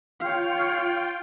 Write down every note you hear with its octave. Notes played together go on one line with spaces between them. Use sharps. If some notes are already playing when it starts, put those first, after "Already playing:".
F4 C#5 F5 G5